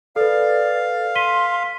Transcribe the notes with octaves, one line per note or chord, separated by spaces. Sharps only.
A4 B4 D5 F5
C6 B6 D#7 G7